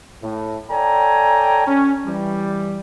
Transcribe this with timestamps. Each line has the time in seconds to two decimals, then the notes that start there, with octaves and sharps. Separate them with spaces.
0.22 A2
0.70 A4 C#5 D5 G5 G#5 A#5
1.67 C#4
2.06 E3 G3